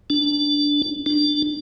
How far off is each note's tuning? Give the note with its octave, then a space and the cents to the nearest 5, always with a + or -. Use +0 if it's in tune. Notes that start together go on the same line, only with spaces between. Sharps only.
D4 -10
D4 +10